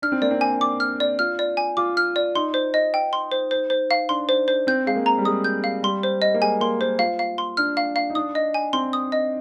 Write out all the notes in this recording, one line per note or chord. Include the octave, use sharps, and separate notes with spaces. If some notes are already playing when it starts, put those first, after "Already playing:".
D4 F6
C4
A#3 D5
C4
G#5
D6
F6
D5
F4 F6
D5
G#5
F4 D6
F6
D5
D#4 C6
C5
D#5
G5
C6
C5
C5
C5
F5
D4 C6
C5
C5
C4 G6
G#3 F5
A#3
A#5
G3
G#3 D#6
G6
F5
G3 C6
C5
D#5
A#3
G#3 G#5
A#3 C6
A#3 C5
F4 F5
F5
C6
D4 F6
F5
F5
D#4
D4 D#6
D#5
G#5
C4 C6
D#6
D#5